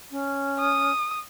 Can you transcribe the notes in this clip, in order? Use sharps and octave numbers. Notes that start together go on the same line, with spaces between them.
C#4
D#6